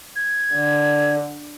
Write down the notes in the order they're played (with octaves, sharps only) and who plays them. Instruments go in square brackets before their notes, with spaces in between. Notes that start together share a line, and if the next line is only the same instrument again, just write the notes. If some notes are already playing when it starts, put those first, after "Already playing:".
[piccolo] G#6
[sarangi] D3